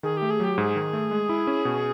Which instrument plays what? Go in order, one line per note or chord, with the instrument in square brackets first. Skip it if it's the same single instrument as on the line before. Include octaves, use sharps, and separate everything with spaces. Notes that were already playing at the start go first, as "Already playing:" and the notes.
[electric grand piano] D#3 [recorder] G#4
[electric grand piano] A3 [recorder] G4
[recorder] G#4
[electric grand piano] F#3 [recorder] G4
[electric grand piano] G#2 [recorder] G#4
[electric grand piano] D#3
A3
G#3
E4
C#4
B2